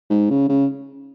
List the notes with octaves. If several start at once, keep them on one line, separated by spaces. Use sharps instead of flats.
G#2
C#3
C#3